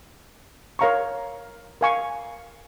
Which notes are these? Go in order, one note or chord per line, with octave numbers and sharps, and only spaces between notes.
A#4 C#5 F5 A#5 C#6
A#4 F5 G#5 C#6